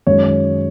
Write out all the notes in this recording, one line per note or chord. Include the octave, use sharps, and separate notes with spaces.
F#2 D#3 G#3 C#5
C#5